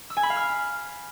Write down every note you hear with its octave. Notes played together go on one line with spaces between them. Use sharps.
E6
G#5
B5
F5
F6